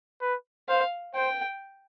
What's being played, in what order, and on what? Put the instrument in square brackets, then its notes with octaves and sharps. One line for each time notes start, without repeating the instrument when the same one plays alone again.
[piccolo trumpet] B4
[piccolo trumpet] C5 [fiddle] F5
[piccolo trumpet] C5 [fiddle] G5